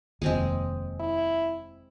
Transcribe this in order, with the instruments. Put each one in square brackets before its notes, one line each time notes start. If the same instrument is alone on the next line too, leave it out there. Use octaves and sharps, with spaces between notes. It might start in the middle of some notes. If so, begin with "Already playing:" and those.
[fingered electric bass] F1 D#2 [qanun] G#3 C4 G#4
[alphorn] E4